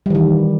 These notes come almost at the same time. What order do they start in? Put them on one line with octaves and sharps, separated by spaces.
G3 E3 D#3